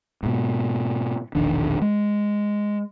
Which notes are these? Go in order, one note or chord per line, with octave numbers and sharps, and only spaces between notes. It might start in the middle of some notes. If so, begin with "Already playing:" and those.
G#2 B2
E1 A#1 D#3 D4
G#3